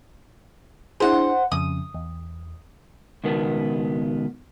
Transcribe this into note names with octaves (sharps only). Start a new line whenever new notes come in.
D4 E4 G#4 C5 F#5
F2 C#3 D#6
E2
C#2 B2 D#3 B3